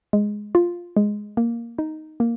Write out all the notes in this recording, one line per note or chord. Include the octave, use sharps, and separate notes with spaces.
G#3
F4
G#3
A#3
D#4
A#3